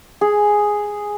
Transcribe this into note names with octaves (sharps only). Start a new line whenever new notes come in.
G#4